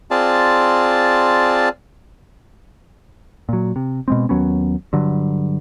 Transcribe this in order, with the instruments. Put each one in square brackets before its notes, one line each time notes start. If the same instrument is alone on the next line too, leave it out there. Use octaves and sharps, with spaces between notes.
[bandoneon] C4 F4 G#4 D5 A5
[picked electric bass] A#2 F#3
C3
B2 G#3 C4
D#2 F#3 B3 C#4
G2 D3 F#3